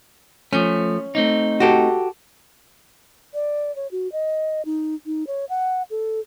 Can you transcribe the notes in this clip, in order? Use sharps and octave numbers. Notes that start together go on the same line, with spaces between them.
F3 A3 C#4
A3 C4 D#4
F#4 G4 A4
D5
C#5
F#4
D#5
D#4
D#4
C#5
F#5
A4